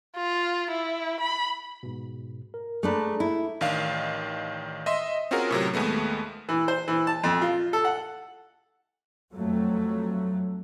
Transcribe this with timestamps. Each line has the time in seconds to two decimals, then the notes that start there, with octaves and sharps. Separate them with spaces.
0.16 F4
0.71 E4
1.20 B5
1.83 G#2 B2
2.54 A#4
2.83 A3 D4 G#4 B4 A5 A#5
3.20 E4
3.61 A1 D#3 D4 F5
4.86 D#5 E5 C6
5.31 C4 C#4 F4 F#4 G#4 A#4
5.51 A2 C3 F#3
5.74 D#2 G#3 A3 B3
6.49 E3
6.68 C5
6.88 E3
7.07 A5
7.23 F2
7.42 F4
7.73 A4
7.85 F#5
9.32 F2 F#3 A3